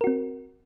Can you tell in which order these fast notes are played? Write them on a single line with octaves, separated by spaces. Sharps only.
A#4 F#4 C4